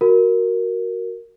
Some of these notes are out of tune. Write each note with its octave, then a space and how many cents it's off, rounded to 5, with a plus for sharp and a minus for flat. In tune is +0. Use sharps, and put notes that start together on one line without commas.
F#4 +0 A#4 +0